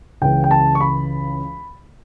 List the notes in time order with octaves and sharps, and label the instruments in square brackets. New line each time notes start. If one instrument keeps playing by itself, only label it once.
[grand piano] C#2 C#3 E3 G5
G5
A5
C#6
B5